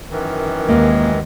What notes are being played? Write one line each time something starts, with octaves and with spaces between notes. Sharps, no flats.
F#2 D#3 E3
D#2 G#3 A#3 F5